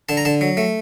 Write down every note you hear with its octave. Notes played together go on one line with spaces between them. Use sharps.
D3 A5
A#5
D3 A5
F#3
A3